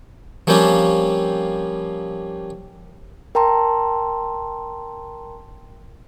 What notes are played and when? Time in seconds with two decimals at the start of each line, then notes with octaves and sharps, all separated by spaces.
0.47 F3 G3 A#3 C4 C#4 F4
3.35 A#4 G5 A5 A#5 C6